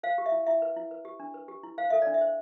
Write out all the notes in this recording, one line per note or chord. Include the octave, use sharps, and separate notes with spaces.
C5 F5
G4
E5
E4
E4 E5
B4
E4
B4
G4
D4
B4
G4
E4
C5 F5
A4 E5
D4 D5
E5
C5